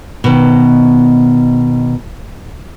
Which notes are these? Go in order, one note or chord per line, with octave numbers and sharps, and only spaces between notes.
B2 D#3